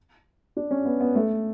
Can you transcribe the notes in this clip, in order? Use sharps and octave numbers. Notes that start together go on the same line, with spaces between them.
D4
C#4
B3
B3
A3